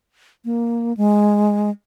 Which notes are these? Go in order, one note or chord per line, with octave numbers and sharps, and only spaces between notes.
A#3
G#3